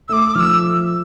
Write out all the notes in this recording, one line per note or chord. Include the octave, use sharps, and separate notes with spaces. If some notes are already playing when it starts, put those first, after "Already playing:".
A3 D6 E6
F3 E6 F6